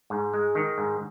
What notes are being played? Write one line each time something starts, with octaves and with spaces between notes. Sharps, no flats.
G#2
G#3
D#3
G#2